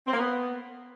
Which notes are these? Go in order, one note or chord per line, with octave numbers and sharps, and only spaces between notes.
C4
A#3
B3